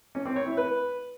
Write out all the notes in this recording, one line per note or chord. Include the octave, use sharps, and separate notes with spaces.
C#4
C4
C#5
E4
B4